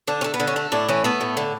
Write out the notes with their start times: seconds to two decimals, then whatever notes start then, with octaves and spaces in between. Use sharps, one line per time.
0.08 D3 D4
0.21 C#4
0.24 A3
0.34 B3
0.40 D3
0.47 C#4
0.56 A3
0.72 A2 D4
0.89 E3 C#4
1.04 A3 B3
1.21 A2
1.37 D3